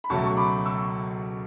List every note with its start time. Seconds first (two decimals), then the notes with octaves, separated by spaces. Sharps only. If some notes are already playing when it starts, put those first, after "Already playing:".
0.04 B5
0.09 C#2 B2 F#3 A3 A5 C#6
0.26 C#6
0.37 B5 D6
0.65 C#6 E6